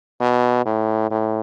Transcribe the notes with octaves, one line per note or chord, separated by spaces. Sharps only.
B2
A2
A2